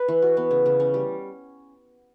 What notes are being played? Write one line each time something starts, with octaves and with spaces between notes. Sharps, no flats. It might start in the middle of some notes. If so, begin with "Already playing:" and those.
Already playing: B4
E3
F#4
B3
C#3
C#3
C#4
G3